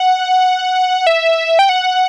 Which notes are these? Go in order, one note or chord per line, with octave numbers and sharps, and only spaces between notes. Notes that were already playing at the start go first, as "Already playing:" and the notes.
Already playing: F#5
E5
G5
F#5